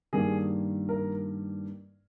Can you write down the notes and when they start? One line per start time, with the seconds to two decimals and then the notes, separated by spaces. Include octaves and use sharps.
0.13 G2 D#3 A#3 G#4
0.89 A#4